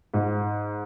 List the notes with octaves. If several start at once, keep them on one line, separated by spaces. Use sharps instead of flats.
G#2